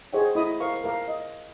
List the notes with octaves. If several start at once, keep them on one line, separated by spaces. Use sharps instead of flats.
G#4 C5 C#5 D#5 F#5 G5
E4 D#5 B5 D#6
A#4 C5 F5 C#6
A#4 F5 D6
D#5